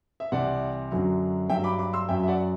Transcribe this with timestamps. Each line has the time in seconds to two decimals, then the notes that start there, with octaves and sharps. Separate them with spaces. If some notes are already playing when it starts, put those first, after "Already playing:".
0.20 E5
0.32 C2 C3 E3 D5 F#5
0.92 F#2 D3 F#3
1.49 G2 F#3 E5 G5
1.64 B5 D6
1.79 B5 D6
1.93 C6 E6
2.09 F#2 F#3 E5 G5
2.23 E5
2.28 D5 F#5